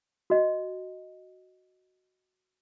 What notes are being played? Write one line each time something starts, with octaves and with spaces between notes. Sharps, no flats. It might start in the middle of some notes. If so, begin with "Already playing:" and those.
F#4 D#5